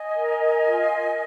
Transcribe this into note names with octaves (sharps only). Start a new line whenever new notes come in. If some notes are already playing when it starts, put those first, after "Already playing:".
Already playing: D#5 G#5
A#4
A#4
F4
A#4